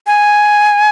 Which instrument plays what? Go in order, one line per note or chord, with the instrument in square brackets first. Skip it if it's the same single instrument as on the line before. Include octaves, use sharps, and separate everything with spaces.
[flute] G#5